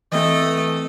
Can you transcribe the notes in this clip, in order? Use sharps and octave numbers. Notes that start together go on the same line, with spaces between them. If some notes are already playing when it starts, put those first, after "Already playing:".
E3 A3 C4 D#5